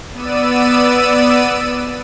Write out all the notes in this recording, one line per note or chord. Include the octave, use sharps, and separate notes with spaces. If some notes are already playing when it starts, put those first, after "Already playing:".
B3 D5 E6 D#7